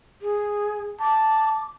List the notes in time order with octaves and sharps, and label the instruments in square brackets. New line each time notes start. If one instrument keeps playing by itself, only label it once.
[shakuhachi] G#4
[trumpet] A5 [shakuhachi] D6